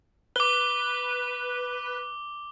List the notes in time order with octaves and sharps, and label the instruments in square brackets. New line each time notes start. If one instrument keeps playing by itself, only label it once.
[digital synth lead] B4 [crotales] D6 G7